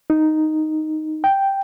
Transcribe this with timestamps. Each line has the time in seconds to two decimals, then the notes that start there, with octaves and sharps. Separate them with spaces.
0.10 D#4
1.24 G5